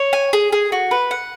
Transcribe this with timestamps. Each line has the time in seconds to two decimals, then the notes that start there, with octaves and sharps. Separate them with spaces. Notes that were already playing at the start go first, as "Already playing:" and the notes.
Already playing: C#5
0.13 G#5
0.33 G#4
0.52 G#4
0.72 F#4
0.91 B4
1.11 F#5